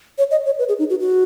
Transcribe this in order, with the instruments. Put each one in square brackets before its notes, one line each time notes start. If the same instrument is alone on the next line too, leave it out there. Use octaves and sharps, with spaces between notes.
[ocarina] C#5
D#5
C#5
B4
G#4
D#4
F#4
F#4